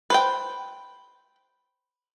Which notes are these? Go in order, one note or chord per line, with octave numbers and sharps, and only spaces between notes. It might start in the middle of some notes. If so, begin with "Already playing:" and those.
B4 C5 G5